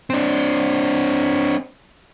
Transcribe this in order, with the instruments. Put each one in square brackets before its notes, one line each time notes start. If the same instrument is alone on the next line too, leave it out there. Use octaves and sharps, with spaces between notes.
[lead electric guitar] C4 D4